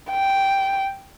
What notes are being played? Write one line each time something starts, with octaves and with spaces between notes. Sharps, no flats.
G5